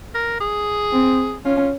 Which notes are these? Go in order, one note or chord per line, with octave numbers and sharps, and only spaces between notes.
A#4
G#4
C4
C#4 F4